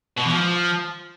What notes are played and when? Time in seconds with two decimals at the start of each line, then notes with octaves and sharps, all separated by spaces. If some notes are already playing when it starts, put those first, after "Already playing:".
0.17 B2
0.24 E3
0.32 F3